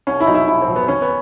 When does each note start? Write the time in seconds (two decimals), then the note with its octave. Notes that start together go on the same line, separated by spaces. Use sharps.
0.07 C2 C#4
0.21 E4
0.27 B2 F#3 D#4
0.34 E4
0.47 C2 E4
0.62 C4
0.68 B2 F#3
0.76 B3
0.88 D#2 C#4
1.02 B3